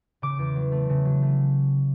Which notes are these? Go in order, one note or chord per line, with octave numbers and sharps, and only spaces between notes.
C#3 D6
E2
F#3
A3
C#3
F#3
A3